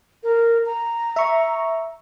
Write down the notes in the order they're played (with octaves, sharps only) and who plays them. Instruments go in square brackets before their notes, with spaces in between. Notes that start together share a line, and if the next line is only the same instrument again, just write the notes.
[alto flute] A#4
A#5
[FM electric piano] E5 C#6